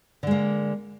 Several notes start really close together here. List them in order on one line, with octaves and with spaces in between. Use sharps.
D3 G#3 A#3